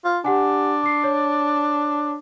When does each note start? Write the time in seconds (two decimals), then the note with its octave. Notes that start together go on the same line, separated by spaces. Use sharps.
0.04 F4
0.25 D4 G4 F#5 G#5
0.83 D6 C7
1.04 C#5